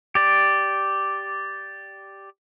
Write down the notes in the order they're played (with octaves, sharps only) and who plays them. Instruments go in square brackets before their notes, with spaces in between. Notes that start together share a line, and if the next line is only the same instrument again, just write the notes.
[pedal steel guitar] G4 D5